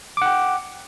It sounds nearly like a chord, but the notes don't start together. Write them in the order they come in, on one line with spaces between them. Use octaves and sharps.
D6 F#5 G5